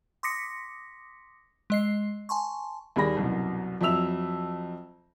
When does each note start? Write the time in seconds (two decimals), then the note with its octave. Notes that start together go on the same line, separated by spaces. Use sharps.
0.23 C6 D6 D#6 A#6 B6 C#7
1.70 G#3 D#5 C7
2.29 G#5 A5 C6 C#6
2.96 D#2 G3 G#4 B5 A#6
3.17 C2 F#2 B2
3.81 F2 F#3 E5 E6 F7